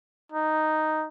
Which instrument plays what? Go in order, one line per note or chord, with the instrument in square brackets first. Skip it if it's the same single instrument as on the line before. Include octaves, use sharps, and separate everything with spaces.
[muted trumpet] D#4